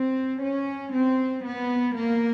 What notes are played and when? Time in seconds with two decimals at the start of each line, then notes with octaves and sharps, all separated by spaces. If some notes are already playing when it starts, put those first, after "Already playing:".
Already playing: C4
0.42 C#4
0.93 C4
1.44 B3
1.96 A#3